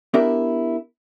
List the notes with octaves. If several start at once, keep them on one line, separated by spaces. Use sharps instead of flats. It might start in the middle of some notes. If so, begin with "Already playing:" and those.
B3 D4 E4 G4 A#4 E5